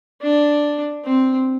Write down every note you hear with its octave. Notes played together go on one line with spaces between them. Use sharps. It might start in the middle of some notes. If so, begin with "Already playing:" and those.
D4
C4